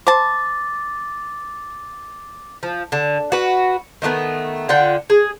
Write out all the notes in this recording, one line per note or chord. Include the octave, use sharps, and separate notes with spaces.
C5 A5 D6 A6
F3
D3
F#4 B4
D#3 G#3 A3 B3
D3 F4 F#5 G5
G#4